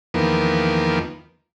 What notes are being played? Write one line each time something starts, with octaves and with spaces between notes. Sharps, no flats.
E2 D#3 F3 A#3 B3